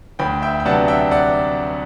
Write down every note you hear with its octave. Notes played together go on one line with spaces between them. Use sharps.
D2 G5 B5
E5 G5
G5
C3 F#3 B3 D4 F#5 A5
E5 G5
D5 F#5